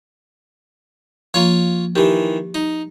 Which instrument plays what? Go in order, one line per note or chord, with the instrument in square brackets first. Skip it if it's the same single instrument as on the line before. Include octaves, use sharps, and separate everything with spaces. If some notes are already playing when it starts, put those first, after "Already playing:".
[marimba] F3 A#3 [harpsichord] F4 C#5
[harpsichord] D#3 E3 [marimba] G4
[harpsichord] D#4